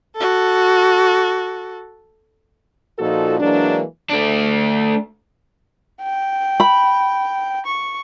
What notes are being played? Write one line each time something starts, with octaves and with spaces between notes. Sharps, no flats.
F#4 A4
A#2 F3 D#4 F#4 A4
E3 F#3 G#3 A#3 D4
A3 D4
G5
B5
C#6